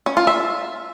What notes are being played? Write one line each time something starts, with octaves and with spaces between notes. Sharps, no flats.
C#4
F4
E5